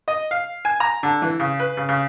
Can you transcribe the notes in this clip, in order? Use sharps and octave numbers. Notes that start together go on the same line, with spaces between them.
D#5
F5
G#5
A#5
D3
E3
C#3
B4
C#3
C#3